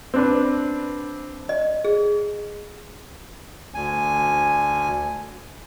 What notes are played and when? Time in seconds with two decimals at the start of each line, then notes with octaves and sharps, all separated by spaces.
0.14 C4 D4 B4
1.49 D#5
1.84 G#4
3.74 D2 G#5